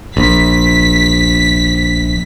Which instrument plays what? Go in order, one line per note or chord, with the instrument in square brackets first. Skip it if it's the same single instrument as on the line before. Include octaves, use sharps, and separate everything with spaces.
[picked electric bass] A#1 [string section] B6